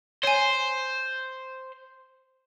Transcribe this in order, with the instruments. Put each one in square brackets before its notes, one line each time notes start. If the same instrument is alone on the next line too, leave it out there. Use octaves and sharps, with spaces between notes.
[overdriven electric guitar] C5 [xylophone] C#5 G#5